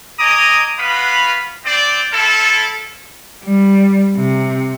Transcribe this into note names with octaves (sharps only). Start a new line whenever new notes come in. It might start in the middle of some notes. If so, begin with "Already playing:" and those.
D#5 G#5 A#5 D6 D#6
B3 F#4 B4 F5 B5
C4 D5
E4 F4 A4
G3
C3